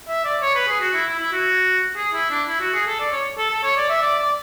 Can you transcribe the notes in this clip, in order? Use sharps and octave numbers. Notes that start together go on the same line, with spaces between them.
E5
D5
C#5
B4
G#4
F#4
E4
E4
E4
F#4
G#4
E4
D4
E4
F#4
G#4
A4
D5
C#5
A4
A4
C#5
D5
E5
D5
D5